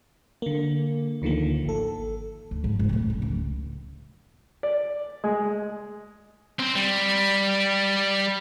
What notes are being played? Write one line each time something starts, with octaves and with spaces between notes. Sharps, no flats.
D3 A#3
D2 D3 D#3 F3 A#3
G#1 A4
D2
G#2 F3
E2 G#2
F2 A2
C#4
C#2
D5
G#3
C4 C5
G3